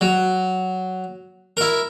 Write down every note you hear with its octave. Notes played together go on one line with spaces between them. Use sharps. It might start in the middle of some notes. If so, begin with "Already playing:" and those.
F#3
E4 A#4